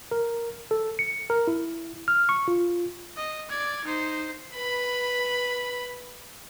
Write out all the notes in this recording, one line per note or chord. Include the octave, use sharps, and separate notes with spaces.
A#4
A4
C#7
A#4
E4
F6
C#6
F4
D#5
D5 G#6
D#4 C5
B4 B5